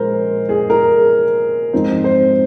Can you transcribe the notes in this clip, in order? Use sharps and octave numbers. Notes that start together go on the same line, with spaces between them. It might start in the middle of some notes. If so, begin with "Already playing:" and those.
Already playing: A#2 F3 G#3 A#4 C5
G#4
A#4
G#2 F3 C4 D#4
C5